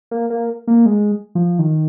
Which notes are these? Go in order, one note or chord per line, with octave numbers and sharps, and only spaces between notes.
A#3
A#3
A#3
G#3
F3
D#3